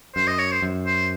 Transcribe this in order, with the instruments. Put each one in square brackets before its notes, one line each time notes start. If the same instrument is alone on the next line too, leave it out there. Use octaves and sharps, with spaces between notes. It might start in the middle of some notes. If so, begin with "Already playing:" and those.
[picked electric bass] F#2 [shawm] C5
[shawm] D#5
C#5
C5
[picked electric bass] F#2
[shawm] C5